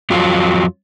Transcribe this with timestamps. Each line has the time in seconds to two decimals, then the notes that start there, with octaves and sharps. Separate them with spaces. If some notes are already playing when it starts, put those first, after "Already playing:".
0.10 F2 F#3 F4